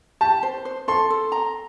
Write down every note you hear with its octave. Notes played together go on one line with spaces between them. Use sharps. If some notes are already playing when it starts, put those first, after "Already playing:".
G4 A5
C5
C5
A4 C6
A4
A#5